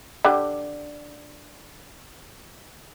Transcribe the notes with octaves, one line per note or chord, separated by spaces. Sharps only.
D3 G4